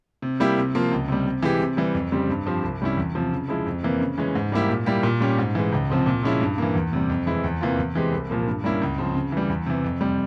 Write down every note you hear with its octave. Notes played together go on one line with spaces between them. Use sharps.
C3
G3 A#3 E4 G4
C3
F3 A#3 F4
C#2
C3 G3
C3
E3 G#3 E4 G4
C3
E3 G3
F2
C#3 G3 C4 G4
G2
F3 C4 G4
C2
C3 G3 C#4 E4
E2
C3 F3
C#3
F3 G#3 E4
F2
C3 E3 A#3
C#3
E3 G#3 C#4
G#2
G3 A#3 E4 G4
A#2
G3 A#3 E4 G4
A#2
G3 C#4 G4
G#2
E3 G#3
C#2
C3 F3 C4
A#2
F3 G#3 C#4 E4
G2
E3 A#3
E2
C3 G3
F2
E3 G#3 E4
E2
C3 E3 A#3 F4
E2
E3 G#3 C4 G4
C2
A#2 F3 A#3
G2
G3 A#3 C#4 E4
C#2
C#3 F3 C4
C#3
E3 G3
E2
C3 E3
F2
C3 G3